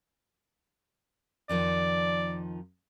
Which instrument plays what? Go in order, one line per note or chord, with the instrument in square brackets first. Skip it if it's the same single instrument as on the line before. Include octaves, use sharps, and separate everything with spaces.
[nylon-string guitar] F2 D#3 F3 [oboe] D5